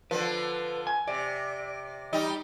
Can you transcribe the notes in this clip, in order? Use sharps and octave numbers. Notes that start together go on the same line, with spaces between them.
D3 F3 B4
G#5
C3 D5
G3 D#4